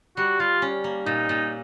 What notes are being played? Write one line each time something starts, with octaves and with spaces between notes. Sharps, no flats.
G3 F#4
G3 F4
C#4
A#3
A#2 D#4
A#2